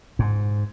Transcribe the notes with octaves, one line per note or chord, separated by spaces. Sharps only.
G#2